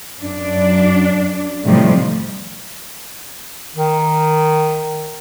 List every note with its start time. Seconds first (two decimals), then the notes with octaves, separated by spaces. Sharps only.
0.20 F#2 D4
1.64 A2 C3 D#3 F3 G3
3.76 D#3